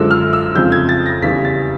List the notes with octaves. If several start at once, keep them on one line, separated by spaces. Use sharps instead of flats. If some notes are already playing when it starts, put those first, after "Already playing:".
Already playing: F#2 D3 F3 G#3 E6
F6
E6
F2 C#3 F3 G#3 G6
G#6
A6
A#6
E2 C#3 E3 G3 B6
A6